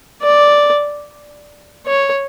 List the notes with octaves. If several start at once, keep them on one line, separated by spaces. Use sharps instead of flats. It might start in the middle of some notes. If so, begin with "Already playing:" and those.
D5
C#5